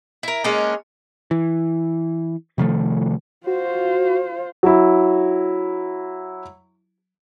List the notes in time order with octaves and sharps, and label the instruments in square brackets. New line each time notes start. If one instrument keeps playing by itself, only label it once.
[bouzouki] E4 A#4
G#3 A#3 C#4 D4
[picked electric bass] E3
C3 D#3 F3 A3
[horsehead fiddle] F4 C5 [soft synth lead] F#4
[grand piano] F#3 E4